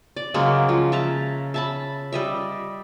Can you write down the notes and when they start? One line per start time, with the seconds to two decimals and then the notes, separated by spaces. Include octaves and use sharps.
0.16 D5
0.34 C#3 F#3 G#3 A#3
0.69 F3
0.92 E5 A5 A#5
1.54 E5 A5 B5
2.13 G3 D#5 E5